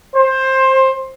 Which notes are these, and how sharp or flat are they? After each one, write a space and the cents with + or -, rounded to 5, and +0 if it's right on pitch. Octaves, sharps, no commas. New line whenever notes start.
C5 +15